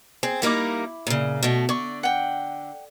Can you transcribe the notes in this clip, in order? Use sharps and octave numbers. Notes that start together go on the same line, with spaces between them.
C4 G#4
G3 A#3 D#4 E4 B5 D6
A#2 C#3
B2 A3
D3 D5 C#6
F#5 G5